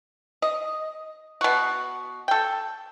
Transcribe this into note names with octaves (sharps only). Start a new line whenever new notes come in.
D#5
B2 F#4
A4 G5